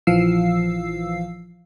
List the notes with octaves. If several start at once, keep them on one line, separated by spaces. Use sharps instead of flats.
A#1 E3 F3 F5 E6 C7